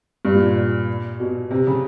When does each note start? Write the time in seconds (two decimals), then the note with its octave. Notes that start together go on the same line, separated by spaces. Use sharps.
0.25 G2
0.35 A#2
0.46 A#2
0.56 A#2
1.20 B2
1.51 C3
1.67 C#3